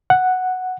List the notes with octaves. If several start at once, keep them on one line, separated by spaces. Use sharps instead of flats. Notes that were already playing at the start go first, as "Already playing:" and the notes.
F#5